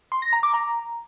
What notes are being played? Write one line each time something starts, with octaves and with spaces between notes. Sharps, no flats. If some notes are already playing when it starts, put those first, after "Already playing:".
C6
A#6
A#5
D6
A#5